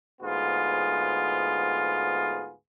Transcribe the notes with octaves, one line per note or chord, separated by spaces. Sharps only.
D2 G#2 B3 F4 G#4